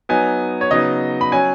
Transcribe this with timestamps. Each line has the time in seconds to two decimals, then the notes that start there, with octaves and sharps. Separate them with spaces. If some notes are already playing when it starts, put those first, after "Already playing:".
0.09 F#3 B3 D#4 G#5
0.61 C#5
0.71 C#3 F#3 B3 D#4 D#5
1.21 B5
1.32 F#3 C#4 G#5